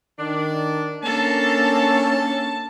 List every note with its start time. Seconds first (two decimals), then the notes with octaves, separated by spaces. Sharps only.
0.19 D#3 D4
1.03 A#3 C#4 D4 A4 A5